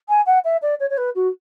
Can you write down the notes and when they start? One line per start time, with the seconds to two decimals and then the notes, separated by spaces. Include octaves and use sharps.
0.09 G#5
0.26 F#5
0.44 E5
0.62 D5
0.80 C#5
0.90 C#5
0.97 B4
1.15 F#4